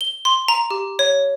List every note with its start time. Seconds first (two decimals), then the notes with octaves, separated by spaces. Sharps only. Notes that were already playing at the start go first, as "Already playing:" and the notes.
0.01 G7
0.25 C6
0.48 A#5
0.71 G4
0.99 C#5